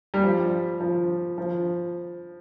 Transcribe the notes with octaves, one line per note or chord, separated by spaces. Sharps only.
G3
F3
F3
F3